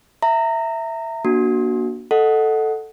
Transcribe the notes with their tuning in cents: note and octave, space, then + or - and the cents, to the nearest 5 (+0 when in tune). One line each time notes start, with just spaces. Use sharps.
E5 +0 A#5 -30
A#3 +30 D4 +0 F#4 +0
A4 +0 D#5 +0 F#5 +0